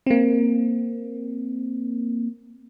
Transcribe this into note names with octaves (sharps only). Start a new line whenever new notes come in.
A#3 C4